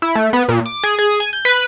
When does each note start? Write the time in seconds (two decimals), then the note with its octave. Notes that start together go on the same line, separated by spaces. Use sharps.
0.02 E4
0.15 A3
0.33 B3
0.49 A#2
0.66 D6
0.83 G#4
0.99 G#4
1.20 G#5
1.33 G6
1.45 B4